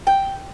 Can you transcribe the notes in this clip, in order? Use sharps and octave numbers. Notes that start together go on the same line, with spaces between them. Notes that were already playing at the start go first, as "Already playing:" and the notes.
G5